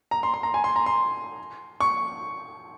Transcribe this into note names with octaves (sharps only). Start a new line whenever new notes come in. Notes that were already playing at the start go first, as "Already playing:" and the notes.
A#5
C6
C6
A#5
G#5
C6
A#5
C6
C#6